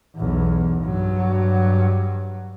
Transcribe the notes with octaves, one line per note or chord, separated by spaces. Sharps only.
B1 E2
G2 F#3